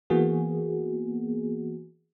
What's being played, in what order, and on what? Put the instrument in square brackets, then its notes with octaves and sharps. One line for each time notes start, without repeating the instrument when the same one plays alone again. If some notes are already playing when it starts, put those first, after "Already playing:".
[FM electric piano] E3 A#3 B3 F#4 G#4